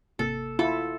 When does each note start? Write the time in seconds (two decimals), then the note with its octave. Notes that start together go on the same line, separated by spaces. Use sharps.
0.19 G#1 C3 A#3 A4
0.59 E4 F4 A4